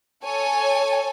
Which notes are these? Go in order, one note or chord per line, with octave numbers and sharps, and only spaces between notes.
A4 C#5 G#5